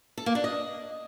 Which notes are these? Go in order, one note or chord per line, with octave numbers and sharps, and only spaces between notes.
A4
A#3
D4
D#5